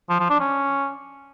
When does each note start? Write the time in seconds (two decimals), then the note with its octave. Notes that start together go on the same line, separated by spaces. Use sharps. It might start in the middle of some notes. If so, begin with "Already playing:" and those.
0.09 F3
0.20 F3
0.30 D4
0.40 C#4